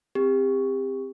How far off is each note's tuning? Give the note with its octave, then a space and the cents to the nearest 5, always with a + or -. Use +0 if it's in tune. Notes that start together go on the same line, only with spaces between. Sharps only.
C4 +0 G4 +30